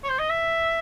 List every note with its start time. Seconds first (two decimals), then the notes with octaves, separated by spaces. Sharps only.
0.04 C#5
0.09 C5
0.19 D#5
0.29 E5